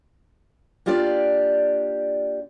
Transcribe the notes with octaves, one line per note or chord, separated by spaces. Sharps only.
A#3 D4 F4 G4 D5